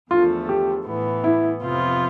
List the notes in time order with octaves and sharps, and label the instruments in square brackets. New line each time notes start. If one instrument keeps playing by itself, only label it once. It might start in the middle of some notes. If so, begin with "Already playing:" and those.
[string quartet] E2 D3 F3 A3 [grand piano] F4
[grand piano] G4
[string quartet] A2 E3 B3
[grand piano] E4
[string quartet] F2 C3 F3 B3 F4